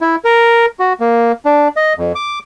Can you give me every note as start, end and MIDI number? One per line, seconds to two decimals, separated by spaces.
0.01 0.16 64
0.25 0.66 70
0.80 0.93 66
1.00 1.32 58
1.45 1.68 62
1.76 1.93 75
1.98 2.12 41
2.15 2.39 86